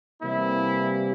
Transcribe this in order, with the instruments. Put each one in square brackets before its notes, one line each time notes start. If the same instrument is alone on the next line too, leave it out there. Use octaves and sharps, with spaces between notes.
[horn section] C3 E3 G3 A#3 E4